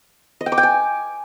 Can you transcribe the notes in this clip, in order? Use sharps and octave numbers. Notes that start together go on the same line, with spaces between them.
D#5
G5
D6
G5
G#5